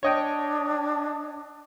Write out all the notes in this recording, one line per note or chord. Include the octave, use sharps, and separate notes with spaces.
D4 C#5 D#5 G5